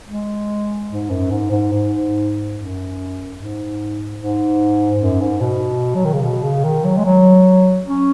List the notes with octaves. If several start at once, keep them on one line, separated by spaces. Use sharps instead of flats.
G#3
G#2
F#2
G#2
G#2
G#2
F#2
G#2
G#2
F#2
G#2
B2
F#3
D#3
C#3
B2
C#3
D#3
F#3
G#3
F#3
C#4